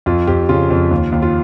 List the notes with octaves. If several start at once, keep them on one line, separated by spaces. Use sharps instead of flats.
F2 F4
F2 G4
C#3 F4
F2
D#2
D#2
F4